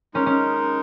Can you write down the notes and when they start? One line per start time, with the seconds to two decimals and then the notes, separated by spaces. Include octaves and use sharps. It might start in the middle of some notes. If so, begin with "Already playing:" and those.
0.14 G#3 C#4 D#4 A#4
0.26 C#4